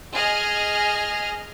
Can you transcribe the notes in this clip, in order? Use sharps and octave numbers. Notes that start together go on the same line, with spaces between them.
G#4 D#5 F6